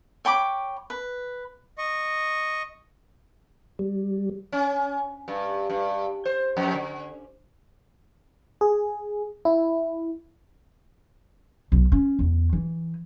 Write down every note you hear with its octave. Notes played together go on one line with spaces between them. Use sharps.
C#5 G5 B5 D6
B4
D#5 C#6
G3
C#4
G2
G2
C5
F2
D3
G#4
E4
B1
C#4
E2
E3